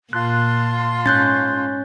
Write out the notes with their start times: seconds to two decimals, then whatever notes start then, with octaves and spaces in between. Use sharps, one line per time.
0.13 A#2 F4 A5 C6 F#6
1.06 G#2 C#4 F#6 G6 A6